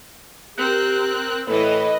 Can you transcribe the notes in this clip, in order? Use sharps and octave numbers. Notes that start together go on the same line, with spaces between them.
C4 G4 A#4 F#6
A2 E3 A4 B4 D#5